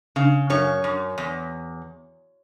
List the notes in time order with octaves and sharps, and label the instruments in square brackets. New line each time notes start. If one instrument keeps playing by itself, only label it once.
[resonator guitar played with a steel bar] C#3
F#2 C#5
F#2
E2